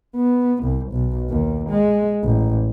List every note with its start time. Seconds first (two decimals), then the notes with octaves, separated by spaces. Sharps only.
0.16 B3
0.63 C2
0.93 B1
1.30 D#2
1.69 G#3
2.24 A1